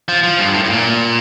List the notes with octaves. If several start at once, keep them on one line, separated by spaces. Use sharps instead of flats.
F3
F3
G2
A2
A2
A#2